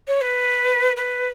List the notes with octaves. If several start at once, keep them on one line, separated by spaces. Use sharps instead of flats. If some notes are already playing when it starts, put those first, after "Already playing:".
C#5
B4
B4